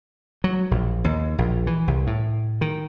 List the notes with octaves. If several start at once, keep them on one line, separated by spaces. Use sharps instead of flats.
F#3
A#1
D#2
A#1
E3
C2
A2
D#3